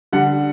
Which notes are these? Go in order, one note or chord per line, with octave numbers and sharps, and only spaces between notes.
D3 G3 F#5